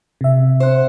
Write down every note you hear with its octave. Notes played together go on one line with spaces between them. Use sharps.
C3 E5
C5 F#5